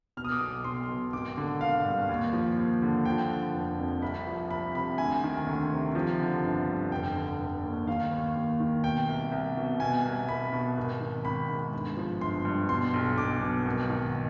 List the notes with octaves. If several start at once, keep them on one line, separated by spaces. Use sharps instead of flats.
B2 F6
D#6
D6
B1 D#6
B1 C6
B2
G#1 D6
D3
G#1 F5
G2
D#2
F3
D#2
D3
F3 G5
D3
F1
F2
C2 B5
F3
C2 B5
C3 B5
D2 G#5
D#3
D2
C3
F3
D3
G1
G2
F1 G5
D3
F1
D#2
D#3 F5
D#2
D#2
D#3
B2 G5
C2
C2
B2
B2 G#5
C2
C2 B5
B2
G#1
D#3
G#1 B5
G#2
G1
F3
G1 C6
G2
B2 C6
B1
B1 D6
B2
G#1
D#3